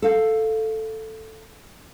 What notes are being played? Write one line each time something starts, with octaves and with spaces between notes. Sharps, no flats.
A4 F5